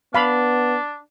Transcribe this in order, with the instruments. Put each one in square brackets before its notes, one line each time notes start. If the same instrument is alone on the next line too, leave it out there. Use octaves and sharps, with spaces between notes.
[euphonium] B3 [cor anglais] D4 [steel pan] F5 B5